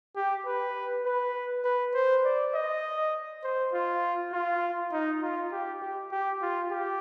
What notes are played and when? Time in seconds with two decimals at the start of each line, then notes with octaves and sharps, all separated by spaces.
0.16 G4
0.46 B4
1.05 B4
1.64 B4
1.94 C5
2.24 D5
2.54 D#5
3.43 C5
3.73 F4
4.33 F4
4.92 D#4
5.22 F4
5.52 G4
5.82 G4
6.11 G4
6.41 F4
6.71 G4